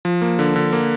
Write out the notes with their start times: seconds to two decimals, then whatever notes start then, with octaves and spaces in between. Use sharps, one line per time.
0.05 F3
0.22 A#3
0.39 D3
0.56 D3
0.73 A#3